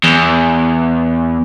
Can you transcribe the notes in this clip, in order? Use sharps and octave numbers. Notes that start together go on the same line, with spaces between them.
E2